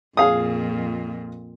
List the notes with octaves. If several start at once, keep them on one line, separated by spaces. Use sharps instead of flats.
F2 A#2 G#4 F5 D#6